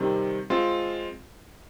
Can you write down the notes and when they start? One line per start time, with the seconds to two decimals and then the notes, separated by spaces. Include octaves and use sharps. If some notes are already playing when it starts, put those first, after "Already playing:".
Already playing: C3 D#3 G3 C4
0.50 G#3 C4 F4